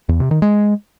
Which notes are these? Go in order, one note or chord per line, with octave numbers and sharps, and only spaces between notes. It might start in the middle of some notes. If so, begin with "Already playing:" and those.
E2
C3
D#3
G#3